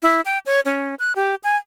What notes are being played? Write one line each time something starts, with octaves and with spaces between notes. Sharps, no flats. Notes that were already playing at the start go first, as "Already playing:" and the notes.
E4
G5
C#5
C#4
F#6
G4
G#5